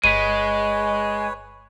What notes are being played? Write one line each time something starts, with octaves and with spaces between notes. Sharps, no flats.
G1 G#3 B4 C#5 B6 D#7